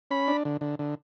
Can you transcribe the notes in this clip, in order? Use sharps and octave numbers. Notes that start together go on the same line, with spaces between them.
C#4 B5
D4
D3
D3
D3